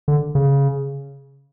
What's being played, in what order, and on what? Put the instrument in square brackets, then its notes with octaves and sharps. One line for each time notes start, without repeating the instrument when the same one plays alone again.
[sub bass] D3
C#3